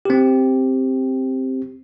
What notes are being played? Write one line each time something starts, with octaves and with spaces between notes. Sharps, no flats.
C4 G4